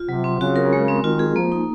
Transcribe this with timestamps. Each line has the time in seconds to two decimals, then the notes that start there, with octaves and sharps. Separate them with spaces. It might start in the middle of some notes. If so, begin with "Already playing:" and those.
Already playing: F4
0.09 C3 F#3
0.24 C4
0.40 C#3 F#4
0.56 A#4
0.73 G#3
0.88 C4
1.04 D#3 F4
1.19 G#4
1.36 F3 A#3
1.52 D#4